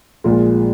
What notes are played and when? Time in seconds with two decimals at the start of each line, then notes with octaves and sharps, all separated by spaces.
0.24 A#1 A#2 G#3 F4